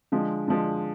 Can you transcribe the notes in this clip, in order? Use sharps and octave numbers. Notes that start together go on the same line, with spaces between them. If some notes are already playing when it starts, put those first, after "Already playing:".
D3 F3 G#3
D3 F3 G#3